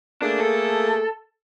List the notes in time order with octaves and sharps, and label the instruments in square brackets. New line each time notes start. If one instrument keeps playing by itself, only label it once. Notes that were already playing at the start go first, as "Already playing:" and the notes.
[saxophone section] A3 A#3 G#4 [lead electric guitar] D4
[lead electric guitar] A4